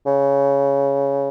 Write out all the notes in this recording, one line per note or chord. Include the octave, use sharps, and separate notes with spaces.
C#3